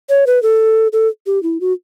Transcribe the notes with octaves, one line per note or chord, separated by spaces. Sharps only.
C#5
B4
A4
A4
G4
E4
F#4